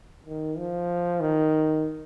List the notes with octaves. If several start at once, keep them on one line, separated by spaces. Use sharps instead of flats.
D#3
F3
D#3